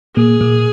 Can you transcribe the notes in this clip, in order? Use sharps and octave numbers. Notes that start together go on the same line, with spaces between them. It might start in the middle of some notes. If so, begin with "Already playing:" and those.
A#2 A#3 G#4
A#2 A#3